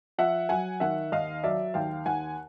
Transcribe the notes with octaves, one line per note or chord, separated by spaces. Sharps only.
F3 E5 F#5
F#3 F#5 G#5
D#3 E5 F#5
D#2 D#5 F5
F#3 D5 E5
D#2 F5 G5
D#2 F#5 G#5